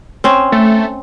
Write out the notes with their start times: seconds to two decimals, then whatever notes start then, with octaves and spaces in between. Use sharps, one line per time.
0.24 C4 C#4 C5
0.52 A3